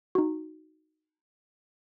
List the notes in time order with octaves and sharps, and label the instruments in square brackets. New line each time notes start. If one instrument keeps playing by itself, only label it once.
[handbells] D#4 F#4